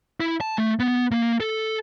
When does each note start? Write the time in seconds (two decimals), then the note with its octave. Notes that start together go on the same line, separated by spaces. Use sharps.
0.20 E4
0.41 A5
0.58 A3
0.80 B3
1.11 A#3
1.40 A4